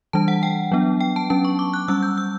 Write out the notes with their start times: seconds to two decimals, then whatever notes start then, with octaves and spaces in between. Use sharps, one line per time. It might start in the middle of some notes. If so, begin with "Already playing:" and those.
0.13 E3 G3 D4 A5
0.28 F#5
0.43 G5
0.72 F#3 B3 D4
1.01 G5
1.16 A5
1.30 F#3 C#4 A5
1.45 C#6
1.59 D6
1.74 F#6
1.88 G3 C#4 E6
2.02 G6
2.18 E6